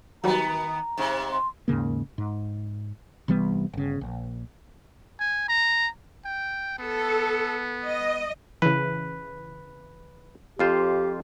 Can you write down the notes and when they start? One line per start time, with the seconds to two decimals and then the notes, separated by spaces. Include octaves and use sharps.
0.24 D#3 F#3 G3 B3 F#4 A#5
0.97 G#2 C3
1.32 C6
1.68 D#2 G#2 C#3 A#3
2.18 G#2
3.28 C2 E3 G3 B3
3.73 G1 C#3
4.01 A#1
5.20 G#5
5.49 A#5
6.25 G5
6.78 B3 A4
7.85 D#5
8.62 C#3 E3 B4
10.59 F2 F4 G4 C5